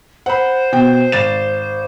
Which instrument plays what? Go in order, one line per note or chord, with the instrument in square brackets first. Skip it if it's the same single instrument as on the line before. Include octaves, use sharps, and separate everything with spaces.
[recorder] C5 [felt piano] F#5 B5
[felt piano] B2 G5
G#1 A6 E7